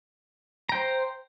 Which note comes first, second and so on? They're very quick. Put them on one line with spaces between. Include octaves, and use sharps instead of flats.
A#5 G5 C5